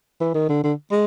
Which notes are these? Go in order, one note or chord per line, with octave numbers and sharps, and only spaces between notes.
E3
D#3
D3
D3
G#3